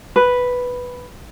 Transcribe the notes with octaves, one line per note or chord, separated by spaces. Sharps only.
B4